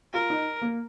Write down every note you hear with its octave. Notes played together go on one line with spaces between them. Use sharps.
F4 A#4
D#4
A#3